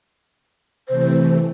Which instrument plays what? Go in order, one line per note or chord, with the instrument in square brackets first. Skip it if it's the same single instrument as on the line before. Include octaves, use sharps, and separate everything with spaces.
[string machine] C3 E3 A3 [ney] C5